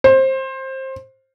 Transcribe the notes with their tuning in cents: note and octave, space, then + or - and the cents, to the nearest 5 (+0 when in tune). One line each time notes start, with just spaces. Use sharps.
C5 +20